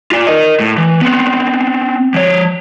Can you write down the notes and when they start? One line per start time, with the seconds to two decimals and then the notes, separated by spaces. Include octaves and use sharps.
0.12 F4 D5
0.27 A#4 D#5
0.60 A2
0.77 E3
1.01 B3 C4
2.14 F3 C#5